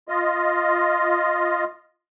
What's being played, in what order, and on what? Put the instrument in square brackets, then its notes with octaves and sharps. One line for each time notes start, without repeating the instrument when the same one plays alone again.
[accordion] F4 D#5